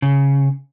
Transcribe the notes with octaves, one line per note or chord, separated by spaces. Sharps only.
C#3